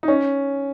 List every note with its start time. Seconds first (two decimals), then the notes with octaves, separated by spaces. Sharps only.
0.03 D#4
0.08 C#4